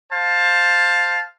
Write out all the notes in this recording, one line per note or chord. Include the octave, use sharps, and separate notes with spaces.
C5 F5 A5